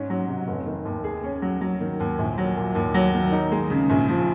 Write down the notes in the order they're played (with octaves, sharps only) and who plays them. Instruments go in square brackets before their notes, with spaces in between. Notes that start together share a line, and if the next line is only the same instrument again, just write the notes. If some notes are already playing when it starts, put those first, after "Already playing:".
Already playing: [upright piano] G#2 C#4
F#3
C3
F1
D#3
D#2
G#4
C#4
F#3
F#3
D#3
D#2
A#1
F#3
A#2
D#2
F#3
D#3
D#4
G#3
C#3
A#1
F3